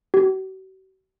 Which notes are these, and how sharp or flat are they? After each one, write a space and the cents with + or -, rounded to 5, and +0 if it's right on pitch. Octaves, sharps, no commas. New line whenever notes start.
F#4 +45